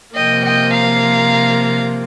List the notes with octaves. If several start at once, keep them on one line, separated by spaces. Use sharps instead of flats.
C3 F3 A#3 D#5 G5
D#5 G5
F5 A#5